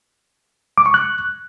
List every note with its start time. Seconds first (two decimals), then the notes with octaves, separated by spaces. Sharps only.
0.78 D6
0.86 C#6
0.94 F#6